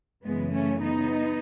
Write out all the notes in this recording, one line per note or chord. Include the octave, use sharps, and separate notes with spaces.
F#2 C#3 E3 G#3 B3
A3 C#4
B3 D#4